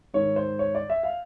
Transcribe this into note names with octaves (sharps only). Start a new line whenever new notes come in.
G#2 D#3 C#5
C5
C#5
D5
E5
F5